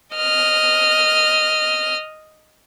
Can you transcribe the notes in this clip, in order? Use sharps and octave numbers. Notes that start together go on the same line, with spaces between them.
D#5 F6